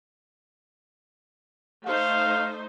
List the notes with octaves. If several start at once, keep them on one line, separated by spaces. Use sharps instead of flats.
A3 D#4 C5 F5